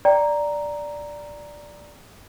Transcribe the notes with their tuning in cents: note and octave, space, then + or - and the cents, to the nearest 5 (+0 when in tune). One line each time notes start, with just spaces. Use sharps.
D5 +0 G5 +0 A#5 +0